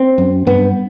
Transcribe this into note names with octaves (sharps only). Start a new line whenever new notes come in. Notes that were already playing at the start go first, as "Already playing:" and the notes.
Already playing: C4
F#2
G2 B3